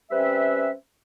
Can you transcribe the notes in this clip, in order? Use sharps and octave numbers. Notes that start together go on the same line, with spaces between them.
G3 C4 C#4 B4 E5